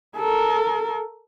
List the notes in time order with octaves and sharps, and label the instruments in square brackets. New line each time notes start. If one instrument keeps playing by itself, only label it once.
[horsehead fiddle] A4 A#4